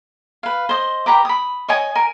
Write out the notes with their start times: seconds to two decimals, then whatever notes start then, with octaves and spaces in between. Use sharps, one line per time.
0.43 B4 F5
0.69 C5 D#5
1.06 G4 B4 A#5 D6
1.25 B5 D#6
1.69 C#5 D#5 G#5 D#6
1.95 A#4 G#5